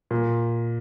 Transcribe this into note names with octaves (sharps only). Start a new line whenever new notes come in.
A#2